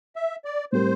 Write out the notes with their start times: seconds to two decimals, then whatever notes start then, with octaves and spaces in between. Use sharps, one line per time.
0.16 E5
0.45 D5
0.72 A2 G3 C4 G4 A#4 C5